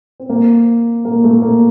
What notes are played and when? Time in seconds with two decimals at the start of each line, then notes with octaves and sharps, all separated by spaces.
0.20 C4
0.29 A#3
1.05 A#3
1.24 A3
1.42 A#3